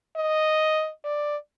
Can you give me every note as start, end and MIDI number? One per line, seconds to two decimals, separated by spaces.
0.17 0.91 75
1.04 1.37 74